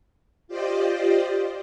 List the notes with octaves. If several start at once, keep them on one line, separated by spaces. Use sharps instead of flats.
F4 G4 C5 D5 D#5